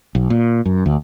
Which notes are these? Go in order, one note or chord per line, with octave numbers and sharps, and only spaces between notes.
B1
A#2
F#2
D2